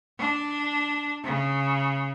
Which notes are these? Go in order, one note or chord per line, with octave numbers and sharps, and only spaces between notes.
D4
C#3